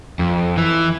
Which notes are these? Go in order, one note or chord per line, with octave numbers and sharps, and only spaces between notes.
F2
E3